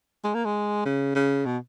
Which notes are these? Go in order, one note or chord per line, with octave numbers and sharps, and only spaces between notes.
G#3
A#3
G#3
C#3
C#3
B2